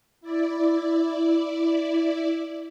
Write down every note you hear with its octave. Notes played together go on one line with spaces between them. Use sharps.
E4 D5